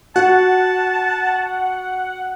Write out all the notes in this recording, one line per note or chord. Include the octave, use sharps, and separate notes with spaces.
F#4 F#5 A5